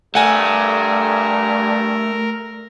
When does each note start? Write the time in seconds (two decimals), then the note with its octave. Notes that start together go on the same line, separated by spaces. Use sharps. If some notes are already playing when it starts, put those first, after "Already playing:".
0.15 G2 A3 A#4 F#5 G#5